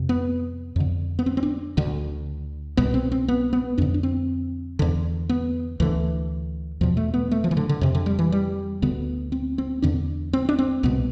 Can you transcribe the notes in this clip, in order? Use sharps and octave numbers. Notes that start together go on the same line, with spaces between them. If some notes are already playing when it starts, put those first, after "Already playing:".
Already playing: F2 C3
B3
F2 D3
B3
C4
C4
D4
D2 D3
C2 B2 B3
C4
C4
B3
B3
F2 D3 D4
D4
C4
E2 D3
B3
D2 D3 E3
E2 B2 F3
A3
B3
A3
F3
E3
D3
D3
F2 C3
D3
G3
E3
G3
D2 D3 B3
C4
C4
E2 D3 D4
C4
D4
C4
C2 B2 B3